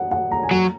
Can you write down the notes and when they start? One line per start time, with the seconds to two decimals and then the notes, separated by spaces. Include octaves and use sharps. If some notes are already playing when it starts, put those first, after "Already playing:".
Already playing: F#5
0.11 F#5
0.31 A#5
0.43 G#5
0.51 F#3 A#5